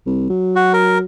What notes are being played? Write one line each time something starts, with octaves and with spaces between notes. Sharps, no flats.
C2
F#3
F#4
A#4